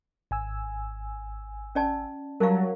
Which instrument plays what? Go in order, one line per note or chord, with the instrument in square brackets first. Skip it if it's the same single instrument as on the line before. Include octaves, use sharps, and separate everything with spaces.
[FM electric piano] G#1 G#5 E6
[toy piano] C#4 D5 A5
[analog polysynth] F#3 [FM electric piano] G3 A5 A#5 [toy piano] A#4 F5